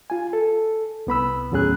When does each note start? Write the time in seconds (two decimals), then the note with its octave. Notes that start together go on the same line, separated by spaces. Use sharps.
0.10 F4 G#5
0.33 A4
1.07 C2 B3 B5 E6
1.51 D#2 A2 F#3 C#4 G#4 F#6